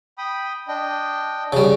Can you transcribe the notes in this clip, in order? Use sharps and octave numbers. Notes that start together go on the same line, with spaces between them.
G5 B5 D#6
D4 D#5 G5
C#3 G3